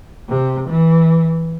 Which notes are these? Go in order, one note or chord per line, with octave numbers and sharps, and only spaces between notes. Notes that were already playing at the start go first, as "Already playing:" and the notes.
C3
E3